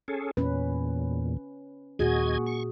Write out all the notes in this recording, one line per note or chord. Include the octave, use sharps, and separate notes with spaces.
C#4 G#4 A4
E2 A#2 C#4 B4
D#2 A#2 F#4 G#4 D#5 G#6
C#6